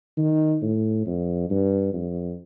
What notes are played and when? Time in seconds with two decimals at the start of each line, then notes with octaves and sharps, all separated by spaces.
0.17 D#3
0.62 A2
1.06 F2
1.50 G2
1.94 F2